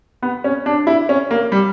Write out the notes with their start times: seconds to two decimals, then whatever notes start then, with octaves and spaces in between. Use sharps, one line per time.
0.22 B3
0.44 C#4
0.66 D4
0.87 E4
1.09 C#4
1.31 A#3
1.52 G3